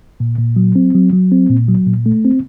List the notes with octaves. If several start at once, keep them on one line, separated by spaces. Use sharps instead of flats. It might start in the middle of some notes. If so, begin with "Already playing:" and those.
A#2
A#2
F#3
C4
F#3
F#3
C4
A#2
F#3
A#2
A3
C4